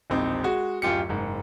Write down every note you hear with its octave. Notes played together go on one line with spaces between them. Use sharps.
E1 A#1 C4 D#4
G#3 F#4
D1 F#2 F4 G4 C#7
F#1 G#2